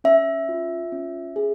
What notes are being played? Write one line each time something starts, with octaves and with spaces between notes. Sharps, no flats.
C#4 E5
F4
C#4
G#4